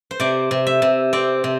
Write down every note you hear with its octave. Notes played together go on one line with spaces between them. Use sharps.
C5
C3 D5
C3
E5
C3
C4 D5
C3